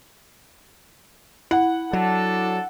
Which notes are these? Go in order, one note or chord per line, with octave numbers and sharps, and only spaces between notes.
E4 F#5
F#3 D4 A4